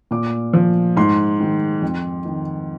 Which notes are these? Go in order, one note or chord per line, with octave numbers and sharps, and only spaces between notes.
A#2 D6
F3
G#2 C6
D#3
F2
D#3